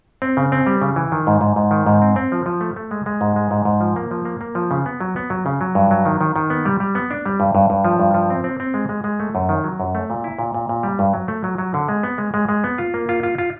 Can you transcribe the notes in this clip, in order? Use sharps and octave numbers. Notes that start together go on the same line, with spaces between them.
C4
C#3
C4
G3
C#3
E3
D#3
G#2
G#2
G#2
D#3
G#2
C4
C4
F3
F3
A3
A3
G#3
G#3
G#2
G#3
G#2
G#2
F3
A#3
F3
A#3
A#3
F3
C#3
B3
F#3
B3
F#3
C#3
F#3
G2
F#3
D#3
D#3
D#3
B3
G3
G3
B3
D4
G3
G2
G2
G2
F3
G2
F3
C4
C4
C4
G#3
G#3
G#3
A3
F#2
D#3
F#3
F#2
A3
A#2
E4
A#2
A#2
A#2
G3
G2
F#3
A3
F#3
F#3
D3
G#3
B3
G#3
G#3
G#3
B3
F4
A#3
F4
F4
F4